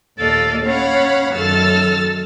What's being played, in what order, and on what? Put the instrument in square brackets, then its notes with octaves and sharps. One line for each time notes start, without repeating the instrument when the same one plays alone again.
[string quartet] D#2 A#2 A4 D5 D#5 F5
C#4 C#5 F5 F#5 B5
F#2 D#3 A4 E6 F6 A6